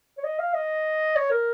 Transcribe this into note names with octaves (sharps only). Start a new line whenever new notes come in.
C#5
D#5
F5
D#5
C#5
A#4